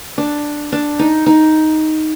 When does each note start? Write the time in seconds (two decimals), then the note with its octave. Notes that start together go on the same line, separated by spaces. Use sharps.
0.18 D4
0.72 D4
0.99 D#4
1.26 D#4